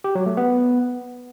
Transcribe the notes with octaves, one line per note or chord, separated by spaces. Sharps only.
G4
F#3
A3
B3